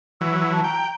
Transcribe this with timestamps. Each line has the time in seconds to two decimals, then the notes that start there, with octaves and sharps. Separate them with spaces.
0.21 E3 F#3 E6
0.52 A5
0.64 G5 A#5